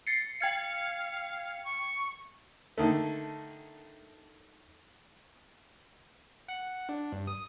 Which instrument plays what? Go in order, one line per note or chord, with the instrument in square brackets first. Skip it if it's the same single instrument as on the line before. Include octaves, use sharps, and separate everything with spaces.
[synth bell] A6 C7 C#7
[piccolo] F5 [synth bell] G5 G#6 C#7
[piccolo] C#6
[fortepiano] D3 D#3 A3
[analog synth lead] F#5
F#5
D4
G2
D#6